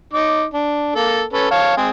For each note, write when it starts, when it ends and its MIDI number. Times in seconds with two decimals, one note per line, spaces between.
0.13 0.44 63
0.13 0.44 86
0.53 0.92 62
0.95 1.22 58
0.95 1.22 69
1.33 1.48 61
1.33 1.48 69
1.33 1.48 71
1.51 1.72 73
1.51 1.72 77
1.51 1.72 81
1.77 1.90 56
1.77 1.90 60
1.77 1.90 68